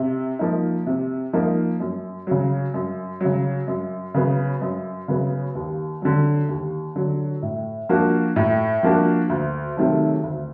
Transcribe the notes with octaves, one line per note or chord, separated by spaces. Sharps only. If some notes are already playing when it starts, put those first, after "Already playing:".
Already playing: C3
F3 A#3 D#4
C3
F3 A#3 D#4
F#2
C#3 F#3
F#2
C#3 F#3
F#2
C#3 F#3 B3
F#2
C#3 F#3 B3
D#2
D3 F#3
D#2
D3 F#3
A2
F3 A#3 D4 F#4
A2
F3 A#3 D4 F#4
D2
C3 D#3 F#3 A3
D2